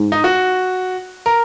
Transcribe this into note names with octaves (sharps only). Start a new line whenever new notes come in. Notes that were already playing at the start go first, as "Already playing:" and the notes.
Already playing: G#2
D#4
F#4
A#4